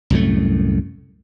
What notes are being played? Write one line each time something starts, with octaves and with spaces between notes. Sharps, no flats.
C2 F#2 A2 A3